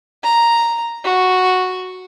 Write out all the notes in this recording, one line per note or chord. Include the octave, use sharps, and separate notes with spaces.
A#5
F#4